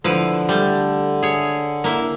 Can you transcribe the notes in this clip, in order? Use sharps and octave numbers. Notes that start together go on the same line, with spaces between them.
D3 F3 E4 B4
G3 A3
G#4 C#5
A#3 E4